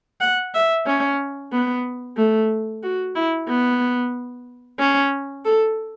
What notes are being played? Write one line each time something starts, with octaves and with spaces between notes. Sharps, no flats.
F#5
E5
C#4
B3
A3
F#4
E4
B3
C#4
A4